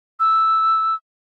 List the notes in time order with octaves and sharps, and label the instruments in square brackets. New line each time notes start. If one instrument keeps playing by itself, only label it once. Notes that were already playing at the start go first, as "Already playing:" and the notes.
[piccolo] E6